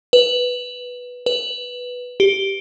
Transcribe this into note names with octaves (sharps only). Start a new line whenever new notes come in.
B4
B4
G4